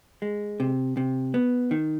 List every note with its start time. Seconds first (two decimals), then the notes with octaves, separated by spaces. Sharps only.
0.22 G#3
0.60 C3
0.97 C3
1.34 B3
1.71 D#3